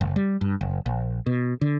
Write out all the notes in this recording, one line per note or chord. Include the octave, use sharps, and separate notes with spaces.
F#1
G3
G2
F#1
A#1
B2
D3